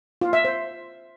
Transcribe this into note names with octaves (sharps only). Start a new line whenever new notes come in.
F4
E5
C5